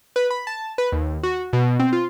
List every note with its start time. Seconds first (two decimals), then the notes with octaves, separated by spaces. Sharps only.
0.16 B4
0.30 B5
0.47 A5
0.78 B4
0.92 D#2
1.23 F#4
1.53 B2
1.79 C4
1.93 F4